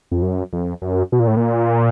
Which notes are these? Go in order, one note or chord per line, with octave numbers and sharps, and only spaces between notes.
F2
F#2
F2
F#2
B2
A#2
A2
A#2